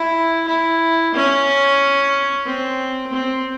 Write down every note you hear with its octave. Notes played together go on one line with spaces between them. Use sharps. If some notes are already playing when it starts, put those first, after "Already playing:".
Already playing: E4
E4
C#4
C4
C4